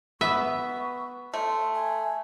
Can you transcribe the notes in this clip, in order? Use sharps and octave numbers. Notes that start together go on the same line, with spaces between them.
B3 E5 C#6
A3 C6
G#5